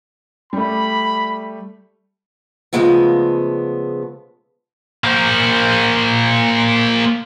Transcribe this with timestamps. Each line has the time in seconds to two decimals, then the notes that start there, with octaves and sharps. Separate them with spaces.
0.53 G3 A3 B5
2.73 C#3 E3 F3 G#3 A3 B3
5.04 A#3 C5